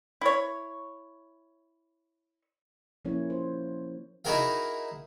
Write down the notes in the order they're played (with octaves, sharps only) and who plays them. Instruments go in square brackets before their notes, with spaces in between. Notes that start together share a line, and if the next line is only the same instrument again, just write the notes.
[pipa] E4 C#5
[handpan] F3 A#3 C#4 E4 C#5
C5
[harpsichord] D#4 E4 F#4 G#4 A#4 F5